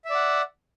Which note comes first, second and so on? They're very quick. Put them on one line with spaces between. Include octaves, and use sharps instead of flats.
E5 D5 F#5